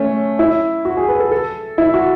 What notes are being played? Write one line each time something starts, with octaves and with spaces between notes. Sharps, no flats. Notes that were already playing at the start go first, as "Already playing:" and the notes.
Already playing: A3 C#4
E4
F#4
G#4
B4
A4
A4
E4
F#4